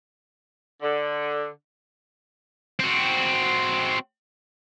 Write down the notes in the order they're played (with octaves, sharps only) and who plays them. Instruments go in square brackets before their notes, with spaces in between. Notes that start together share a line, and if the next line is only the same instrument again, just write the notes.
[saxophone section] D3
[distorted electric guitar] C4 F#4